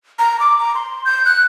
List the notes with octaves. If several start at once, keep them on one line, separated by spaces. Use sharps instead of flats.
A#5
D6
A#5
C6
G6
F#6